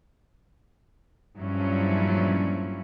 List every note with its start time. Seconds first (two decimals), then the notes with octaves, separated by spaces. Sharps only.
1.37 G2 A#2 F3 F#3 C#4 E4